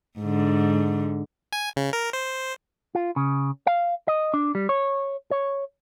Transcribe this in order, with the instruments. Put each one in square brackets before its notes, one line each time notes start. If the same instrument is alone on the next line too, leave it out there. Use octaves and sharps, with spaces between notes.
[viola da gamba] G#2 D3
[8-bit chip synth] G#5
C#3
A#4
C5
[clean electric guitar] F4
C#3
F5
D#5
D4
G3
C#5
C#5